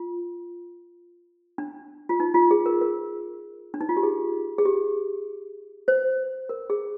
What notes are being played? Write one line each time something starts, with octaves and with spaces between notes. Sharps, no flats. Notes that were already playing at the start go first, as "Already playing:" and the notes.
Already playing: F4
D4
F4
D#4
F4
G#4
A#4
A#4
D4
D#4
F4
G4
G#4
G#4
G4
C5
A#4
G#4